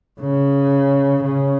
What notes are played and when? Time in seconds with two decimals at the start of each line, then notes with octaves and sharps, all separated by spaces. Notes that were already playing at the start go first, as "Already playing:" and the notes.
0.20 C#3
1.24 C#3